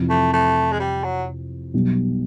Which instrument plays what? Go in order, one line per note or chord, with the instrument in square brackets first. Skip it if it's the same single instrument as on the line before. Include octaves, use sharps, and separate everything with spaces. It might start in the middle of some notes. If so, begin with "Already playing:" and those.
Already playing: [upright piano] F2 C3 E3
[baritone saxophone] A3
A3
G#3
G3
F#3
[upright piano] B1 B2 G3